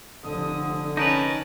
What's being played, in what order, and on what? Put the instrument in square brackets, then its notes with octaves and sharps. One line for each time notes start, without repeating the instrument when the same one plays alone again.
[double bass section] F1 D3 [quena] D#6
[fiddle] C#4 A5 [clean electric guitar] D#4 A#4 B4